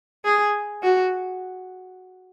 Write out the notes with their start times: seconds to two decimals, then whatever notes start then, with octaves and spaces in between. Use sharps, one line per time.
0.25 G#4
0.83 F#4